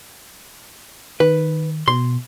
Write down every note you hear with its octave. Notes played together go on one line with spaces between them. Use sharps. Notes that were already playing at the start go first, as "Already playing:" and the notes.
D#3 B4
B2 C6